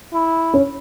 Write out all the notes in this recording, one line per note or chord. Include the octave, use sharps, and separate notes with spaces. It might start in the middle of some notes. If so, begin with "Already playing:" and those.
E4
C#4